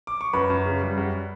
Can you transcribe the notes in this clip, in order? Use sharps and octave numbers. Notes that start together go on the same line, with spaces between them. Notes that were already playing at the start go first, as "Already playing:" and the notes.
D6
C#6
F#2 B4 B5
F#2
C#3
G3
F#2